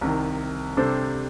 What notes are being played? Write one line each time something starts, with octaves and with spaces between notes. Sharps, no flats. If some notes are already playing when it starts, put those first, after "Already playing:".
C2 C3 D#3
C3 G3 D4 A4 C5